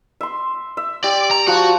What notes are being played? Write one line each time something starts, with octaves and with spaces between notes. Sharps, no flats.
E5 C6
E5
G4 D5
A#5
F3 F#4